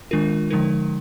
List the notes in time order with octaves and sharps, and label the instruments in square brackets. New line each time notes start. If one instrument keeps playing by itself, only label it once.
[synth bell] D#3 G#3 D4 F4 A#4
D3 F3 G#3 D#4 A#4